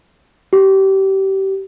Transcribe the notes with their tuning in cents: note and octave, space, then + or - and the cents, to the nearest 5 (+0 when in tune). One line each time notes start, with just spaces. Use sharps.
G4 -25